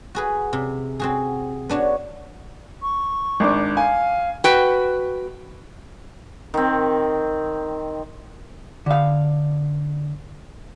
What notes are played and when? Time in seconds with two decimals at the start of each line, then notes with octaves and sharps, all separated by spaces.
0.15 F#4 G#4 B4
0.53 C3
1.00 C4 F#4 G#4
1.69 B3 D4 F#4 C#5
2.82 C#6
3.40 G#1 D4 D6
3.77 F5 G#5
4.44 F#4 B4 G5
6.54 D#3 C4
8.86 D3 F5